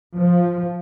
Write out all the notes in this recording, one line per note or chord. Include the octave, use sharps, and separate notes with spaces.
F3